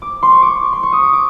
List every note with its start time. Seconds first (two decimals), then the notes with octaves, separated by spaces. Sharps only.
0.02 D6
0.23 C6
0.32 C#6
0.42 D6
0.62 C#6
0.73 C6
0.83 C#6
0.92 D#6
1.03 D6
1.13 D6